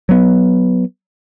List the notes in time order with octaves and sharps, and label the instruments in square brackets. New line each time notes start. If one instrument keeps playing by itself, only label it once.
[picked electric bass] F#3 B3